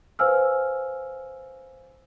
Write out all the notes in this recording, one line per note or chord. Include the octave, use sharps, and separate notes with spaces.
B4 C5 F5 G#5 E6 F6